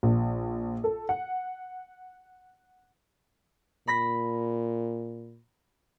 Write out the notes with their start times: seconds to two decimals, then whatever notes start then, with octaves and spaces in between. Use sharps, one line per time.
0.03 A#1
0.84 A4
1.09 F#5
3.87 A#2 B5 A#6 B6